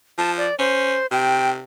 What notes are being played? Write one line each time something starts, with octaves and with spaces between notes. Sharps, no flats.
F3 A5
D5
C#4 C5
C3 G5